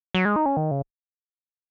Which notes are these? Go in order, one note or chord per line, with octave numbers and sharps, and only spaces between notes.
F#3
G#3
D#4
C#4
D#3
C#3